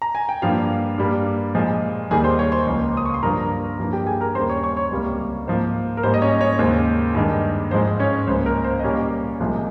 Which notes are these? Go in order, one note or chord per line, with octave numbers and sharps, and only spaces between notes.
A#5
G#5
G5
G2 F3 A#3 F4 F5
G2 G3 A#3
A#2 F3 G#3
D#2 D#3 G3 G#4 G#5
C5 C6
C#5 C#6
C5 C6
C#2 C#3 F3 A#3
D#6
C#6
C6
G2 F3 A#3 A#4 A#5
G2 F3 A#3
G4 G5
G#4 G#5
A#4 A#5
D#2 C#3 G3 C5 C6
C#5 C#6
C#5 C#6
C#5 C#6
C#2 C3 G3 A#3
G#2 F3 A#3 C5
A#4
G#2 G3 A#3 C5
D#5
C#4 C#5
C#4 C#5
D#2 C#3 G#3 C5
G2 D#3 G#3
G#2 F3 G#3 C5
C#4 C#5
C#2 C#3 F3 A#3 C5
A#4
C5
D#5
A#2 G3 A#3 C#4 C#5
C2 A#2 F3 G#3